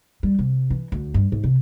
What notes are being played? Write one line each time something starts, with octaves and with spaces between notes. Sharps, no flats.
G3
C3
E3
D2
G2
G#2
C3